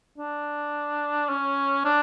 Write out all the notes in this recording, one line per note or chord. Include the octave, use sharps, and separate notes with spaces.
D4
C#4
D4